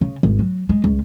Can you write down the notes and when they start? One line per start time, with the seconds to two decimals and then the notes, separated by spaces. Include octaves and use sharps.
0.01 C#3
0.23 G#1
0.39 F#3
0.69 G#3
0.84 C#2